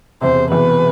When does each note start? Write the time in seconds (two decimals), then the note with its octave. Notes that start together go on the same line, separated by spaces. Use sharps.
0.21 E1 E2 C3 C5
0.50 E1 E2 C3 B4